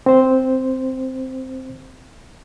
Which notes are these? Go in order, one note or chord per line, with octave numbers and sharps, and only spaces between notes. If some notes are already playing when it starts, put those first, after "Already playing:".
C4 C5